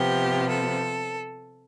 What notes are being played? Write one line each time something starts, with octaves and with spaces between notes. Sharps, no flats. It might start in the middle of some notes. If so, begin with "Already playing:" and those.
Already playing: C3 F3 B3 G4
A4